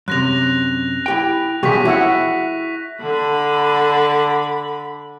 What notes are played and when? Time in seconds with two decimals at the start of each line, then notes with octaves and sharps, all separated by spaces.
0.08 F#2 C3 F#6 A#6 F7
1.06 E4 G4 G5
1.63 B2 F3 F#3 G4 G#4 C#6 B6
1.85 E4 F#4 E5 F#5
3.01 D3 B5